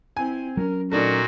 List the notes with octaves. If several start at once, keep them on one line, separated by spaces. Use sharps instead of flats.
C4 E4 G#5
F#3 C4 C#4 A#4
A#2 A3 D4 D#4 F#4 A#4